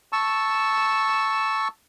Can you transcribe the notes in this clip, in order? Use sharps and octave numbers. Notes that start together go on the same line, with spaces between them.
A5 C#6 E6